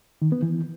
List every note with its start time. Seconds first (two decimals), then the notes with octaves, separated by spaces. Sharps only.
0.22 D#3
0.32 B3
0.42 E3